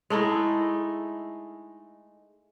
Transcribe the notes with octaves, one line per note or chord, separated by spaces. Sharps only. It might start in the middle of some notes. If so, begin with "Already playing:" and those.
G#3 A3 D#4 E4